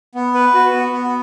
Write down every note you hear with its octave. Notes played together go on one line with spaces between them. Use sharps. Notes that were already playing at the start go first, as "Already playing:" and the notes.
B3
B4
F#4
B3
B3